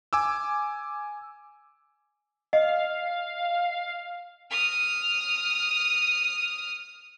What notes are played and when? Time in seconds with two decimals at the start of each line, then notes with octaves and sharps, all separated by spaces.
0.13 G#5 D6 E6
2.53 D#5 F5
4.51 D#6 F6